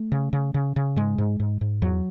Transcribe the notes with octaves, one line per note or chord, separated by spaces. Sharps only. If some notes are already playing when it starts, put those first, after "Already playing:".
Already playing: A3
C#3
C#3
C#3
C#3
G#2 G#3
G#2
G#2
G#2
E2 F#3